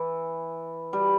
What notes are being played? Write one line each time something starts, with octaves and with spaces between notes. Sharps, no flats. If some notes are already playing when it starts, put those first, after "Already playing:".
Already playing: E3
G3